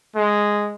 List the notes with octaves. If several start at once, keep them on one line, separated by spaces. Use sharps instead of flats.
G#3